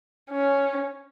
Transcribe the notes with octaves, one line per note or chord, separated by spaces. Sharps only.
C#4